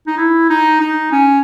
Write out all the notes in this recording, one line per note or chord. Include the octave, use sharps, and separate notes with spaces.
D#4
E4
D#4
D#4
C#4